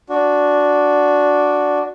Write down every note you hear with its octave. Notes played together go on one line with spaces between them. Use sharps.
D4 F#4